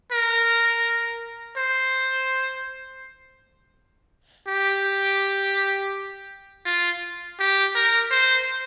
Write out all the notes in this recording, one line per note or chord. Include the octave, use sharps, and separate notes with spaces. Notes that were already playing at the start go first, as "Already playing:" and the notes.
A#4
C5
G4
F4
G4
A#4
C5